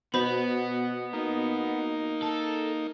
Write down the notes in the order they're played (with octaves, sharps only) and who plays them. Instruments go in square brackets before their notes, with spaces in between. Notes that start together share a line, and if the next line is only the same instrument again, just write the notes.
[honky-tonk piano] B2 [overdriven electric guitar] B3 [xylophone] C5 B5
[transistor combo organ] A#3 D#4
[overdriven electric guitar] A4